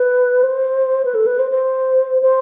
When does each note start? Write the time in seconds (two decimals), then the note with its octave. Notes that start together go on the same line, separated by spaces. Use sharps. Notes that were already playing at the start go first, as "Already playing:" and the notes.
Already playing: B4
0.43 C5
1.05 B4
1.15 A4
1.26 B4
1.39 C5
1.51 C5
2.22 C5